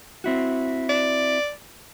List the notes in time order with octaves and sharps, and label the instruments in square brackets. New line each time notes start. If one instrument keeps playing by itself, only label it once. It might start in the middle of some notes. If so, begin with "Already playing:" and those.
[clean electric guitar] C4 E4 F#4
[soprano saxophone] D5